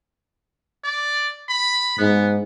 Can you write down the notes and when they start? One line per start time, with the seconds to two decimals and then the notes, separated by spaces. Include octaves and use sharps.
0.84 D5
1.49 B5
1.98 G#2 B3